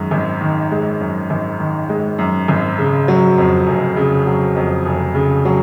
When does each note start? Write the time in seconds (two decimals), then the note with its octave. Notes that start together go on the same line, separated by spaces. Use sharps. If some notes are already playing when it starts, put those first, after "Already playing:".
Already playing: F#2 D#3 G#3
0.11 G#1
0.41 D#3
0.71 G#3
1.00 F#2
1.30 G#1
1.59 D#3
1.89 G#3
2.18 F#2
2.48 G#1
2.78 C#3
3.08 F#3
3.38 F2
3.67 F1
3.96 C#3
4.26 F#3
4.56 F2
4.86 F1
5.15 C#3
5.45 F#3